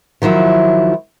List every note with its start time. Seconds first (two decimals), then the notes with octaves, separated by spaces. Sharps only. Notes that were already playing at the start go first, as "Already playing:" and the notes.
0.22 D#3 F3 F#3 E4